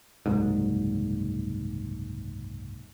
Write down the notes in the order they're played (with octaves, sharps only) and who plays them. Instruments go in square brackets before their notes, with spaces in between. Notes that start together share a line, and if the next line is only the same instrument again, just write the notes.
[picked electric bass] F#1 C2 G#2